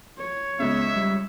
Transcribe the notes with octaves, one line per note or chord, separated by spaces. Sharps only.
C#5
C#2 C#3 B3 E5
G3